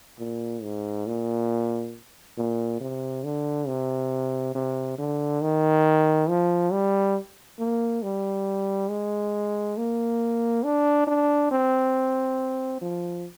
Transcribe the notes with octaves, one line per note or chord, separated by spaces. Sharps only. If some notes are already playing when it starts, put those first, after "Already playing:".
A#2
G#2
A#2
A#2
C3
D3
C3
C3
D3
D#3
F3
G3
A#3
G3
G#3
A#3
D4
D4
C4
F3